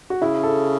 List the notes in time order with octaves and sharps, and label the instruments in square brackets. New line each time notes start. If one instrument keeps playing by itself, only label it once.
[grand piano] F#4
[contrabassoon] C#3 [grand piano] E4
[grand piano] A4